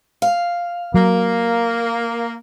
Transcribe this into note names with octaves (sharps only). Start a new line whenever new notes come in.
F5
F#3 A#3